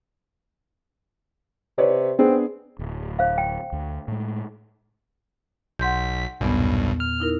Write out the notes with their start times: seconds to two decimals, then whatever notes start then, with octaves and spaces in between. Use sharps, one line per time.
1.78 C3 B4 C#5 D5
2.19 B3 C4 D4 G#4
2.79 D1
3.19 C5 F5
3.38 G5
3.72 D2
4.08 A2 G#3
5.79 B1 F#5 C6 G6 B6
6.41 B1 E2 G2 A#2 B3
7.00 F6
7.20 D#4 E4 A#4